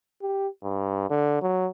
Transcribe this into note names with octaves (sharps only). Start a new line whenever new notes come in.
G4
G2
D3
F#3